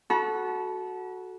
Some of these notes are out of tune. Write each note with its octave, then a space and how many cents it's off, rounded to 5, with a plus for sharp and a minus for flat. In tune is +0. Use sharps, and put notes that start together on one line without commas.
F#4 +0 A4 -20 B5 -45